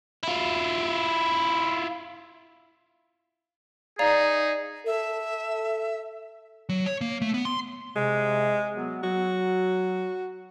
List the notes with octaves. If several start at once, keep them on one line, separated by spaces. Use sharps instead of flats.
E4 F4
D#4 G#4 D5 F5 A#5
A4 E5
F#3
C#5
A#3
A3
B3
C6
C3 G#3
F#3 B3
F#3 F#4